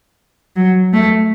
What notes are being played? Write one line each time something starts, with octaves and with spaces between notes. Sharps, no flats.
F#3
A3